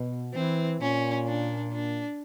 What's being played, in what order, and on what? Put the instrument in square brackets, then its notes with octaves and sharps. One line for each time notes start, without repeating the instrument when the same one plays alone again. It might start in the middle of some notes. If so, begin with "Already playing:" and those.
Already playing: [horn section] B2
[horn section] E3 [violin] C4
[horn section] A#2 [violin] C#4
[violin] D4
D4